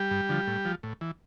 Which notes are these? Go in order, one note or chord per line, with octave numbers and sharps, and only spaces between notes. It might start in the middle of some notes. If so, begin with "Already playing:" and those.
Already playing: G3 G4
G2
D3 F3
A2
F3
A2
E3